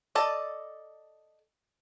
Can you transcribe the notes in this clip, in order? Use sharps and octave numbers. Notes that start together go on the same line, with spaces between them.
A4 D5 D#5